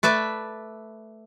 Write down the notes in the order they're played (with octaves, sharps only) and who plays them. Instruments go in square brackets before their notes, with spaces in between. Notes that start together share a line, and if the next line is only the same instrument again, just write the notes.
[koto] A3 B4 D5 E5